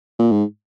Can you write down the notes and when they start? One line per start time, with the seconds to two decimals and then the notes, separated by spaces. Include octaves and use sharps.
0.19 A#2
0.32 G#2